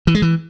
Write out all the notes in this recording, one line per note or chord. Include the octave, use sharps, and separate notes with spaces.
E3
G#3
E3